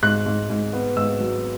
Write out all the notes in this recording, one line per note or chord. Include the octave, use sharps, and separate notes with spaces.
G#2 F#6
G#2
G#2
B3
G#2 E6
F#3